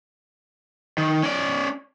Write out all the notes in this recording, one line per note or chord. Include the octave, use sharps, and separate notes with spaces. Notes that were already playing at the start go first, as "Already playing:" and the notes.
D#3
C#4 D5